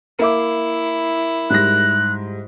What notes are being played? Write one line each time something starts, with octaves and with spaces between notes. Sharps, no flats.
A#3 E4 E5 D6
G#2 G3 F#6 A#6